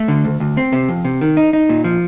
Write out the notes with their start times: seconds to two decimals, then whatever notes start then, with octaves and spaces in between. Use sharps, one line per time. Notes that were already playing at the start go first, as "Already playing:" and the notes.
Already playing: A3
0.08 D3
0.24 D2
0.40 D2
0.57 C4
0.73 C3
0.89 F2
1.05 C3
1.21 D#3
1.37 D#4
1.53 D#4
1.69 A#2
1.84 F3